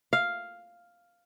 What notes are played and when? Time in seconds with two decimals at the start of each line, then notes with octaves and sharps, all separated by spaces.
0.13 F5